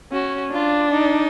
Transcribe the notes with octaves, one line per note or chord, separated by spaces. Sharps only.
C#4 F#4
D4 F4
D#4